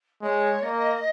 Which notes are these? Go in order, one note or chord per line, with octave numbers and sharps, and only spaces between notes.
G#3 C#5
A#3 D#5